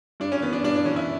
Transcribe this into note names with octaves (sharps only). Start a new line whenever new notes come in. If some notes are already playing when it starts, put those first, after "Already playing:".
G2 D4
C#4
E3 B3
D4
G2 D4
D4
E3 C#4
E4